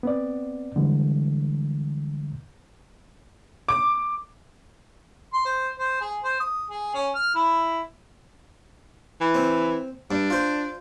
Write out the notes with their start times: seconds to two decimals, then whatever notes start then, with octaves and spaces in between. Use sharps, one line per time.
0.03 B3 C4 D5
0.76 D3 E3 G3 G#3
3.68 D6
5.33 C6
5.45 C5
5.79 C5
6.01 G#4
6.24 C5
6.40 D#6
6.70 G#4
6.94 C#4
7.15 F6
7.35 E4
9.21 E3
9.34 C4
10.11 G2 D4
10.30 F4 C5